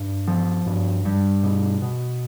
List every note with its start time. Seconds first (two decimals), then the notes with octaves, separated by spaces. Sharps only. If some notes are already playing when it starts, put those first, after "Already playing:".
Already playing: G2
0.28 F3
0.66 G2
1.05 G2
1.43 B2
1.82 B2